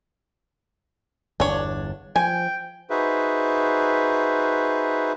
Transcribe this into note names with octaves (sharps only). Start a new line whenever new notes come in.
G1 E2 D4 C#5
F3 G5 G#5
D#4 F#4 G#4 B4 C5 E5